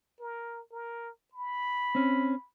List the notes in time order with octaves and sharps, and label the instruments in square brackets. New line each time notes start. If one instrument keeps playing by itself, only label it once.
[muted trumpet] A#4
A#4
B5
[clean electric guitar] C4 C#4